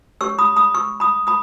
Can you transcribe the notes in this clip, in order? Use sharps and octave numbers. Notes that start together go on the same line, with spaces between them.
C#4 G4 C#5 C#6 E6
B5 D#6
B5 D#6
C#6 E6
B5 D#6
B5 D#6